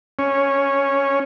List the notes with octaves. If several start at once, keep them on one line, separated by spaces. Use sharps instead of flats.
C#4